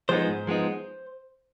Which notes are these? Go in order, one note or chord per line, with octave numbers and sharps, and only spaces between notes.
F3 G#3 B3 D#4 C5
G#2
F3 G#3 B3 D#4